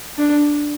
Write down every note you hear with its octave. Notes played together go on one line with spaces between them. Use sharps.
D4